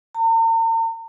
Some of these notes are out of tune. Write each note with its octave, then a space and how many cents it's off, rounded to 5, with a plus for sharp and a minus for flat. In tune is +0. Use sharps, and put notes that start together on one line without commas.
A#5 -45